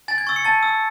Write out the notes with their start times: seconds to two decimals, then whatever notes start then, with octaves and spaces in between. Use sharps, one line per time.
0.08 G#5 A6
0.18 G#6
0.27 C#6 E6 A6
0.36 C#7
0.45 A5 A6
0.63 E6